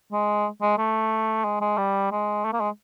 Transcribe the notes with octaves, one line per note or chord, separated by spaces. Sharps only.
G#3
G#3
A3
G#3
G#3
G3
G#3
A3
A#3
G#3